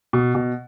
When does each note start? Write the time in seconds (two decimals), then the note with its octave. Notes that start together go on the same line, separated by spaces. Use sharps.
0.13 B2
0.35 B2